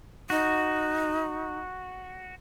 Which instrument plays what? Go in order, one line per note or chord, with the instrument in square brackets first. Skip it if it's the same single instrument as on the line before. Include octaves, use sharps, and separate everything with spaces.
[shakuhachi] D#4 [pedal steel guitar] F#4